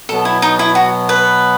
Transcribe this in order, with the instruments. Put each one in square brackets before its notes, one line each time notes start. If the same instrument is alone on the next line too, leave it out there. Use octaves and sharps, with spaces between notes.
[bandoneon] B2 F#3 B3 [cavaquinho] A4
[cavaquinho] E4
D#4
E4
F#4
B4